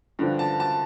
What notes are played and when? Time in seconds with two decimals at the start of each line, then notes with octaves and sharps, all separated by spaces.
0.19 G2 D3 F3
0.39 A5
0.60 A5